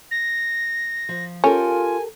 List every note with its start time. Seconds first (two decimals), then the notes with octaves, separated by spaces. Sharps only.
0.11 A#6
1.09 F3
1.44 C#4 F4 G4 A4 A#4 G#5